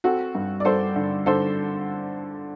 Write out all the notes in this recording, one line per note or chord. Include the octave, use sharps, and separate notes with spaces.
C4 F#4 A4
G2
D5
G2 A4 C5
D3
D3 A4 C5